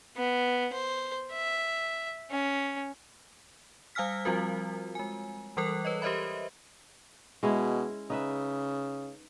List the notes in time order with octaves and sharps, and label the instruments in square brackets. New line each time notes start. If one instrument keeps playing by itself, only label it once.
[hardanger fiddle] B3
C5
E5
C#4
[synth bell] G3 F5 G#5 E6 F6 B6
F3 G3 C4 F4 F#4 A#4
G#3 G#5
E3 G3 A4 A#4 F#6
B4 C#5 D#5
G4 A#4 C5 D#5 E5 B5
[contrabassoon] B2 [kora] G#3 C#4 E4
[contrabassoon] C#3 [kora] D#4 B4 E5